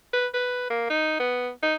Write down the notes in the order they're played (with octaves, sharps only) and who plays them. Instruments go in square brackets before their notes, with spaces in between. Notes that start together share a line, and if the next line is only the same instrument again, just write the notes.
[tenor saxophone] B4
B4
A#3
D#4
B3
D#4